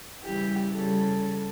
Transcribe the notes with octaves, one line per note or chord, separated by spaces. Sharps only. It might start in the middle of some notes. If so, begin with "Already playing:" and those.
C#3 E3 G3 G4
C#3 G3 A4